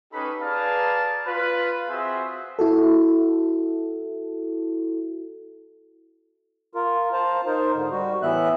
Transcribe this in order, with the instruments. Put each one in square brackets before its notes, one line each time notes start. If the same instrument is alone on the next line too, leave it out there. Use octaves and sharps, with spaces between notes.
[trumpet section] C#4 D#4 G4 A4 B4 B5
G#4 B4 D5 F5 A5 A#5
F4 B4
C4 F4 F#4 G#4 C5 E5
[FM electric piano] E4 F#4 A4
[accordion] F4 A#4
F4 C5 A5 A#5
D#4 A#4 C5
G#2 D3
G3 F#4
A2 E3 B3 E5 F#6